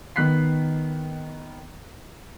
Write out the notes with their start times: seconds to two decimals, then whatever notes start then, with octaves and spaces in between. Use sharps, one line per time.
0.16 D#3 B3 F#6 B6 C7